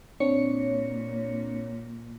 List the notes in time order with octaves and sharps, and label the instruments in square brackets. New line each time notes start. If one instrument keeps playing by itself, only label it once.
[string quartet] A#2 [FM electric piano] C4 D4 C#7 [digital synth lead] C#5